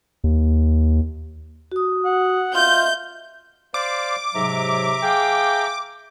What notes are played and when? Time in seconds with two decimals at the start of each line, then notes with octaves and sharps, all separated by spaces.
0.24 D#2
1.72 F#4 D#6
2.05 F#5
2.55 F4 D#5 E5 G6
3.74 C5 D5 F5 D6
4.35 G#2 C3 F#3 E5 A#5
5.03 G#4 F5 G5